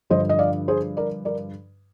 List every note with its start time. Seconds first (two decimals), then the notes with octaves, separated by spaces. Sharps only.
0.10 G2 D3 F3 C5 D#5
0.29 D#5
0.39 D5 F5
0.68 G#4 C5
0.97 A#4 D5
1.25 A#4 D5